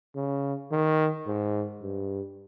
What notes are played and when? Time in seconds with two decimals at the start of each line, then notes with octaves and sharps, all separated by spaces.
0.15 C#3
0.71 D#3
1.26 G#2
1.82 G2